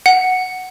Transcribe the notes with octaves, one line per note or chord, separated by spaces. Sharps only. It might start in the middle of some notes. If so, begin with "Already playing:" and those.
F#5